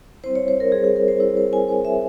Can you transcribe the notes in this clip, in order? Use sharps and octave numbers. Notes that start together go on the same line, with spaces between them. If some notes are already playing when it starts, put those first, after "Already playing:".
G3 C4 E4 C5
C#5
C5
A#4
G3 C4 E4 G#4
G#4
A#4
C5
G3 C4 E4 C5
C5
G#5
G3 C4 E4 C5
E5